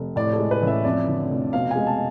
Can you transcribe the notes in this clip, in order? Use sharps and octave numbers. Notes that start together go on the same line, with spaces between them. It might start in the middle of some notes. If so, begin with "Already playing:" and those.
Already playing: F1
A2 D5
A4
G#3
B4
A1 E5
F2 D5
D3
F1
B2 F5
G#3 G#5
A5